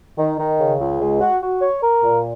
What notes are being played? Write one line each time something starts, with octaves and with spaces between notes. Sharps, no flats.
D#3
D#3
C#3
C#2
G#3
F#4
F#4
C#5
A#4
A#2